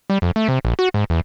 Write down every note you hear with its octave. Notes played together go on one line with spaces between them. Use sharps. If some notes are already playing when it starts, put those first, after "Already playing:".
G3
F2
A3
C3
A#1
F#4
G#2
E2